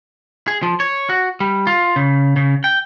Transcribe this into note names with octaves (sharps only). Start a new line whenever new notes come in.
G#4
F3
C#5
F#4
G3
F4
C#3
C#3
G5